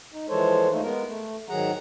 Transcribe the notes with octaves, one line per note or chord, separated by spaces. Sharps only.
D#4
E3 F3 G#3 A4 C5 C#5
D#2 A3 A#3 D#4
G#3 B3 A#4
A3
G#2 D#3 F#3 G#4 F#5 A#5